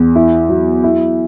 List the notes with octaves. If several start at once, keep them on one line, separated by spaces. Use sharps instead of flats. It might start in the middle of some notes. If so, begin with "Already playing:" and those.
Already playing: E2
E4
F#3
E4